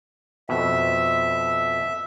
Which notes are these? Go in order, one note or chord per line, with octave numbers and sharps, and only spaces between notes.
F2 B2 E5